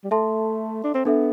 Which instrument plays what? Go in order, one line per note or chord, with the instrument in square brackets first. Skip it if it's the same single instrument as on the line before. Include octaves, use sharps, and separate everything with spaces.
[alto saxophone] G3
[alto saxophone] A3 [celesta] A4 E5 A5 C6
[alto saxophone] D4
C4
[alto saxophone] B3 [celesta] D4 A4 E5